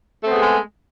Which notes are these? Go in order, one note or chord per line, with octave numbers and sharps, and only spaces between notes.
G#3 A3 B3 C4 G#4